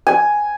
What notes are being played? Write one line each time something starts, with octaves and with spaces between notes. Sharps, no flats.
G#5